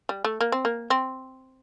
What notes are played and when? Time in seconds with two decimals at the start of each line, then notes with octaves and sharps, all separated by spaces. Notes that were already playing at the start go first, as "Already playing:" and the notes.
0.09 G3
0.24 A3
0.41 A#3
0.52 C4
0.65 A#3
0.90 C4